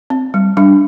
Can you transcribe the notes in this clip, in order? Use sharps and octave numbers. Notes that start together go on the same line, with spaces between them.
C4
G3
G3 D4